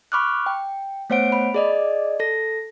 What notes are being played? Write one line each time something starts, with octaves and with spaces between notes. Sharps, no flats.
B5 C#6 D6 F6 F#6
G5
A3 B3 C5 C#5 F#5 D7
B5
G#4 D5 D#5
A4 A#6